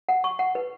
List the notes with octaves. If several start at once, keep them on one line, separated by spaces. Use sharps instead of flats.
F#5
C#6
F#5
B4